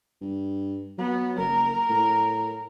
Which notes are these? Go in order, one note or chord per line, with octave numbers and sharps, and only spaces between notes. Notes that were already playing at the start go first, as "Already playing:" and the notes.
G2
F#3 B3
F#1 A#4
A2